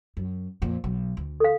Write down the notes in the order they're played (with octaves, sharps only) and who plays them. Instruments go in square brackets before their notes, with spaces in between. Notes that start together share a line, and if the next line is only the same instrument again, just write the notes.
[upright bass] F#2
F2 A#2
B1
D2
[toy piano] A4 F5